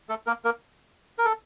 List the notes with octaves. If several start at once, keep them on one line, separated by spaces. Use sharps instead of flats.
A3 A4
A#3 A#4
A#3 A#4
A#4
A4